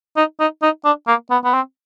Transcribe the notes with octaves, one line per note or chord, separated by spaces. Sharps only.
D#4
D#4
D#4
D4
A#3
B3
B3
C4